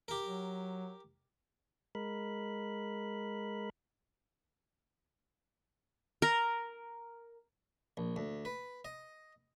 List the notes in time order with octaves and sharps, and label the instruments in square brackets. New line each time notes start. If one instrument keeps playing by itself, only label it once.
[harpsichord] G4 A#4
[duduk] F#3
[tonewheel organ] G#3 A#4 B5
[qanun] A#4
[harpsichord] A#1
D2
B4
D#5